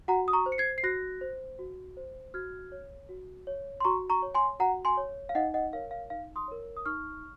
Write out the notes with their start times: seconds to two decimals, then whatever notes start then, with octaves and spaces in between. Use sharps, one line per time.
0.08 F#4 F#5 A#5
0.28 D#6
0.33 A#5 C#6
0.46 C5
0.52 C#7
0.58 G#6 C7
0.78 C7
0.83 F#4 F#6 A#6
1.21 C5
1.59 F#4
1.97 C5
2.34 F#4 F6 G#6
2.72 C#5
3.09 F#4
3.47 C#5
3.80 C6
3.85 F#4 A#5 C#6
4.10 A#5 C#6
4.22 C#5
4.35 G#5 C6
4.59 F#4 F#5 A#5
4.85 G#5 C6
4.97 C#5
5.29 F5
5.35 D#4 D#5 F#5
5.54 D#5 F#5
5.73 A#4 C#5 F5
5.91 F5
6.10 D#4 F5
6.36 C6 D#6
6.48 A#4 C#5
6.77 D#6
6.86 D#4 C#6 F6